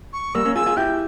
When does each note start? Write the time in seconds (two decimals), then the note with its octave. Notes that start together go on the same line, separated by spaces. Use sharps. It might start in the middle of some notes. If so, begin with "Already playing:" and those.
0.13 C#6
0.35 G3 A#3 E6
0.45 A#3 C#4
0.55 F4 G#4 E6
0.66 F4 G#4
0.77 E4 G4 G6